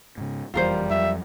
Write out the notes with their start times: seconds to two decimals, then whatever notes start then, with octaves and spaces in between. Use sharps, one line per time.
0.18 G#2 C#3
0.54 F#1 F2 E3 G3 F4 A#4 C5
0.90 F2 F#3 E5